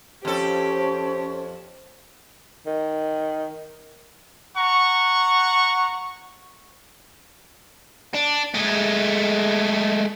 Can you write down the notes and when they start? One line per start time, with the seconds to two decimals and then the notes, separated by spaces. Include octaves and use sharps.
0.25 F2 C#4 G4 A4 C5 C#5 A5
2.67 D#3
4.56 F#5 A#5 C#6
8.15 D4
8.55 G#3 A3